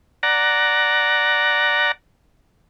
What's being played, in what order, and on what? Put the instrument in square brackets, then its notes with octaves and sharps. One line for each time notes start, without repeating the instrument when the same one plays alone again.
[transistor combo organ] D5 F#5 A#5